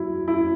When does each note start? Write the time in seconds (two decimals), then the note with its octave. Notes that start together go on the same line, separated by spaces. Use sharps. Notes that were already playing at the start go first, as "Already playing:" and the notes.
Already playing: F#3 E4
0.28 E4